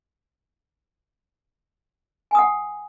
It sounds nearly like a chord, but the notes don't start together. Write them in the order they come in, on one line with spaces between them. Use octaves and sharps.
G#5 D#6 F#5